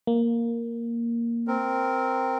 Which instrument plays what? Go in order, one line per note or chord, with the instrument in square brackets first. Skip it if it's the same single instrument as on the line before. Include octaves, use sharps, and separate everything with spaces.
[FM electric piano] A#3
[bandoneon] C4 A#4